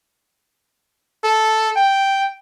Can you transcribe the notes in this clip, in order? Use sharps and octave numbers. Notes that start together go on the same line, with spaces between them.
A4
G5